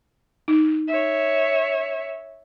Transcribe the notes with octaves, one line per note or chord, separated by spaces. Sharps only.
D#4
C#5 E5